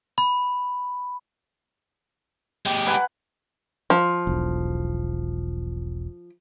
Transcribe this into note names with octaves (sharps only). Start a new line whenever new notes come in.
B5
G#3 G4
B4 F#5 G#5
F3
E1 B1